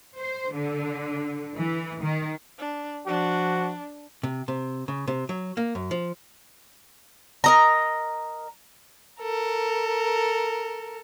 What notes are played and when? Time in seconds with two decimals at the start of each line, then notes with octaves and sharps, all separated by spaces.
0.16 C5
0.54 D3
1.56 E3
2.01 D#3
2.58 D4
3.07 F3 D4 F#4
4.23 C3
4.48 C3
4.88 C#3
5.08 C3
5.29 F#3
5.57 A#3
5.75 F#2
5.91 F3
7.44 A#4 D#5 A#5
9.22 A4 A#4